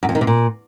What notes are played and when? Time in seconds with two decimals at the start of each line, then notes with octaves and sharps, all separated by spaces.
0.03 F#2
0.09 F2
0.15 D#3
0.21 C3
0.27 A#2